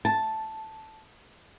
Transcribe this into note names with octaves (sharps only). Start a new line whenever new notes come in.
A5